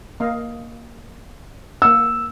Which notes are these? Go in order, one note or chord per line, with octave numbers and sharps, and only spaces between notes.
A#3 D#5 F5
A#3 F#5 E6